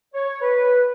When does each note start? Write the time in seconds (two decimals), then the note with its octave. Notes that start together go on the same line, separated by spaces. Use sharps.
0.14 C#5
0.41 B4